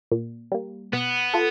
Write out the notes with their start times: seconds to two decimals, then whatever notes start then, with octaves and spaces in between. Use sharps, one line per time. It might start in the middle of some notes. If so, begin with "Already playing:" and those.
0.12 A#2
0.52 G3 A#3
0.93 B2 B3
1.34 F4 A4